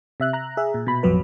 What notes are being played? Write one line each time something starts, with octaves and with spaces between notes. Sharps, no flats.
C3 E5 F#6
A#5 F#6
G#4 E5
A#2
B2 B5
A1 F2 F#3 B4